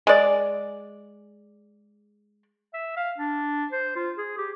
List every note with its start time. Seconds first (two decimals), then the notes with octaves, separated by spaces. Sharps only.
0.07 G#3 D5
2.73 E5
2.97 F5
3.18 D4
3.72 C5
3.96 F4
4.17 G#4
4.38 G4